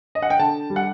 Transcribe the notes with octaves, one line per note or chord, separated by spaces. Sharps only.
D#5
F#5
G5
D3 A5
G3
F#5